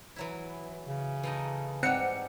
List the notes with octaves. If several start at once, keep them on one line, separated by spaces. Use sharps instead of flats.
E3 F#3 E4
C#3
E3 A3 D#4
G#2 G3 C4 F#5 C#7